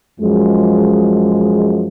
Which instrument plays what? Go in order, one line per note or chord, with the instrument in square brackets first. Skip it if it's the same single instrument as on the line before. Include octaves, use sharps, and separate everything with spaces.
[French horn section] F#2 F3 G#3